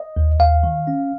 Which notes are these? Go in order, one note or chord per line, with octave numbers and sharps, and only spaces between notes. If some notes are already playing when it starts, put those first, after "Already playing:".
Already playing: D#5
D#2
D#2 F5
D#3
C#4